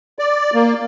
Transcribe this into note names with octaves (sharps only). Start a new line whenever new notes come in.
D5
A#3